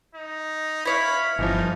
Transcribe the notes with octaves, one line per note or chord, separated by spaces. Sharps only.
D#4
E4 C#5 F5 B5
G1 E3 F3 D#4